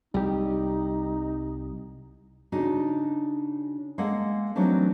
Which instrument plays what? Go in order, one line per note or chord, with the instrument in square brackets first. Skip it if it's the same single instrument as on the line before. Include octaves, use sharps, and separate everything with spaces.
[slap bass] C2 [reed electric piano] G3 G4 [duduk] D#4
[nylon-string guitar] C#3 D4 D#4 F#4
G#3 A#3 A4 F#5
E3 F#3 A3 C4 D4 D#4